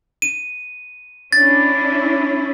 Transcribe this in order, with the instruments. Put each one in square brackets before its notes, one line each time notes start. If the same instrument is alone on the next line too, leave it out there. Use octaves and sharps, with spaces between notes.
[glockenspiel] D#7
[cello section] C#4 D4 E4 [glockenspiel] A6